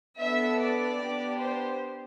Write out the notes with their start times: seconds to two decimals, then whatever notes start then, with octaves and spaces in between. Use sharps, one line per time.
0.19 B3 D4 A4 E5
0.59 D5
1.00 B3 D4 G4
1.40 C5